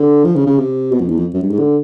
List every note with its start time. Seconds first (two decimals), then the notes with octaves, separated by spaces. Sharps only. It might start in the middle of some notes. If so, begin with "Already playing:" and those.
Already playing: D3
0.24 F3
0.35 C#3
0.46 C#3
0.58 C3
0.92 B2
1.00 F2
1.09 E2
1.17 F2
1.34 F#2
1.43 G2
1.50 G#2
1.59 D3